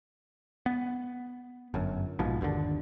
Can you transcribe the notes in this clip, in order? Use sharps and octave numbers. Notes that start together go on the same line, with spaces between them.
B3
G1 F#2
A#1 G#2 B2 F3
G1 D#2 A#2 D3